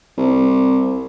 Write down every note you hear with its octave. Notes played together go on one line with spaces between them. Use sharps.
C2